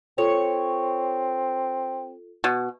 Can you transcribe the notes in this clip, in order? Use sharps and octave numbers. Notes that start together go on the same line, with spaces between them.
C4 F4 A4 C#5
B2